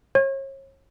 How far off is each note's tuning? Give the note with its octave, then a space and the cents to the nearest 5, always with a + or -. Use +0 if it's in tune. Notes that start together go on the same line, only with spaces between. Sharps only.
C#5 -40